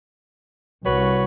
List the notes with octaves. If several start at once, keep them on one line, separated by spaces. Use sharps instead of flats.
C2 F#4 B4 C#5